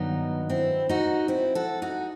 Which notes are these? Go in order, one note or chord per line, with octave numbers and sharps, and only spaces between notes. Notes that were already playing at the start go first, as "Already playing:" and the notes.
Already playing: G2 D#3 F#3 B3 D#4
C4 E4
D#4 F#4
C4 E4
F#4 A4
D#4 F#4